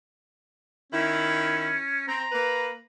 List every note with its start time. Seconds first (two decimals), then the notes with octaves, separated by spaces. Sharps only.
0.92 D#3 C#4 E4
2.08 C4 A#5
2.32 A#3 B4